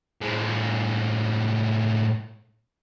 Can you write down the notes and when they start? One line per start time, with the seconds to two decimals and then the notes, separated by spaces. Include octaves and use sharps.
0.21 A2 G#3